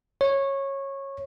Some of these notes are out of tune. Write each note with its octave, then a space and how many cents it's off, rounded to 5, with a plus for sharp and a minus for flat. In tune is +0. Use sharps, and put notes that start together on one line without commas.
C#5 -15